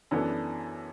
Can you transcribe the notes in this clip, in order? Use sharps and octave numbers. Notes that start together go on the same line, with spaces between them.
F#2 E3 B3 D4 A4